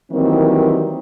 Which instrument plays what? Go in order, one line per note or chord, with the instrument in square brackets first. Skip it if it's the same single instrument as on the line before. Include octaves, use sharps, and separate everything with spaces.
[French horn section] D#3 E3 F#3 G3 A#3 C4